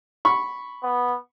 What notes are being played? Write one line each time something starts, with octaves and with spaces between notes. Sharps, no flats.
B5 C#6
B3